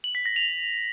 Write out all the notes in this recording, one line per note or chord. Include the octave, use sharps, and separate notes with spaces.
F#7
B6
A#6
F7